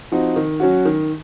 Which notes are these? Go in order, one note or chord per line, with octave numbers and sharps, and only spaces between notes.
F3 C4 D#4 F#4
D#3
F#3 C#4 F#4
D#3